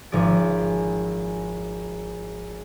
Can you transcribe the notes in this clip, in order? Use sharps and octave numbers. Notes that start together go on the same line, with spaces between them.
G#1 F3 G#4 D5